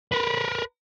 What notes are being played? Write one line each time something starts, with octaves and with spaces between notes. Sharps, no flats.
A#4 B4